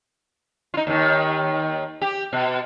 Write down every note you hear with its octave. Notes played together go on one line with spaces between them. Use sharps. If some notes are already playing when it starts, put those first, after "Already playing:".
D#4 F4
D#2 D#3
G4
B2